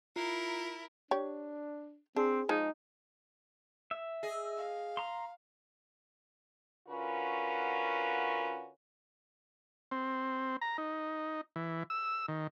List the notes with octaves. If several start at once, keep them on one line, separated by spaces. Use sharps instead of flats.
E4 F4 A#4 A#5 C7
D4 G4 C#5
C4 D4 G#4
F3 G#3 D#4
E5
G#4 D#5
F5
A#5 C6
D3 C#4 F4 F#4 A#4 B4
C4
A#5
D#4
E3
E6
D#3